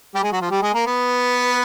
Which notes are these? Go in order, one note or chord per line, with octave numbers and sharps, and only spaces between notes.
G3 G4
G#3 G#4
F#3 F#4
F3 F4
G3 G4
G#3 G#4
A#3 A#4
B3 B4